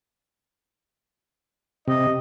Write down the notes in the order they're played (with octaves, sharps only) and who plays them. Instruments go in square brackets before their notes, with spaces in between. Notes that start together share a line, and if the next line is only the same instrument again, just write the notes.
[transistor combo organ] C3 [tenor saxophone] D#5